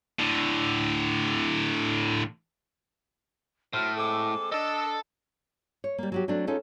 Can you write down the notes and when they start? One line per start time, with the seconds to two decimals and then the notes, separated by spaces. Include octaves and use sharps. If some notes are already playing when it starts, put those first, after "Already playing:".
0.19 A2 D3
3.73 A2 F#3 C5 F6
3.97 G#3 C4 A4 D6
4.52 D4 A4 D#5 A5 E6
5.84 C#5
5.98 G3 A#3
6.12 F#3 F#4 G4
6.28 F#3 A3 C4 D4
6.47 C#4 D#4 F4 G#4 A4